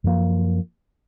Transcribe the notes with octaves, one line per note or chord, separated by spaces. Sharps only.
F#2 F3 A#3